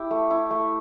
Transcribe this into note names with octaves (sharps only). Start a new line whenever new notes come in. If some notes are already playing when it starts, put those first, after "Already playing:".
Already playing: E4 G4
A3
E4
A3